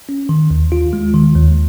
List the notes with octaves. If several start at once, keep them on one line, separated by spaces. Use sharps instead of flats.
C#4
D#3
D#2
F4
G#3
D#3
D#2